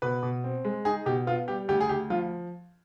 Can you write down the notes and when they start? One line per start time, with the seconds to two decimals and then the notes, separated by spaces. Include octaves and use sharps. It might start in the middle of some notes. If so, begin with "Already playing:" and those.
0.02 B2 B4
0.23 B2
0.44 C4
0.65 G#3
0.85 D#4 G#4
1.06 B2 G4
1.27 B3 F4
1.48 G3 G4
1.68 D2 G4
1.81 G#4
1.89 D2 G4
2.10 F3 F4